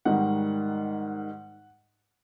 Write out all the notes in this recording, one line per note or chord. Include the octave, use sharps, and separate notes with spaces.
G#2 D#3 G3 F#5